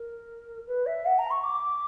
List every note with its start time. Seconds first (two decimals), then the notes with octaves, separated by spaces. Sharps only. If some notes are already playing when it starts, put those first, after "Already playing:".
Already playing: A#4
0.67 B4
0.86 E5
1.05 F#5
1.18 A#5
1.30 C#6
1.43 D6